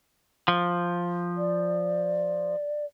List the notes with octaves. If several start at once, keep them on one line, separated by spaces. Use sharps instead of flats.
F3
D5